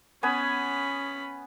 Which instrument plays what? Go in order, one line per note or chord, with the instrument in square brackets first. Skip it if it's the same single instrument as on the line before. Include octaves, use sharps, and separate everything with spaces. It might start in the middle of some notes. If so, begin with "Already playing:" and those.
[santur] B3 G#5 D#6 [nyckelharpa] C#4 B5